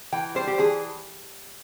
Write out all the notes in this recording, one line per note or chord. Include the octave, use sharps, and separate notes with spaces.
E3 G5
G3 C5
G4
E3 G#4